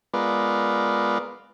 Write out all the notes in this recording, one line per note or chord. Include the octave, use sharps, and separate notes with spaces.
G#3 B3 F4 A#4 B4 D5